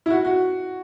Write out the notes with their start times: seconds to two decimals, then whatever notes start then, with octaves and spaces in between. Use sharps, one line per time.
0.06 E4
0.10 F#4
0.25 F#4